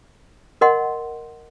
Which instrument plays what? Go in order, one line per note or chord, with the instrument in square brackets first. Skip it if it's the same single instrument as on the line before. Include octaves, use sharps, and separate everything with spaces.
[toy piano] A#4 D#5 F#5 C6